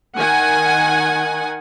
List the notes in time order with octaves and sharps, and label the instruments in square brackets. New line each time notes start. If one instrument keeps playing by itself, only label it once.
[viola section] D#3 F#5 G#5